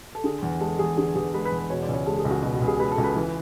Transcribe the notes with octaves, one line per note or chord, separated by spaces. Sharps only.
A4
D3 G#4
E2
G#3 A4
E2 G#4
D3 G#4
E2 G#4
G#3 B4
B4
E2
B4
B2 C#5
D5
C#2
C#5
G#3 A4
G#4
C#2
F#4
B2
F#4
C#2
G#4
G#3 B4
A4
C#2
B4
E3